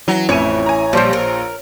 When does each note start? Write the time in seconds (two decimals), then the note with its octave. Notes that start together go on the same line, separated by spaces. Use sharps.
0.08 E3 F#3
0.29 A1 F2 E3 E4 C#5 D#7
0.66 G#5 A#5
0.93 A#1 F3 G3 C5 A5 C6
1.13 A#4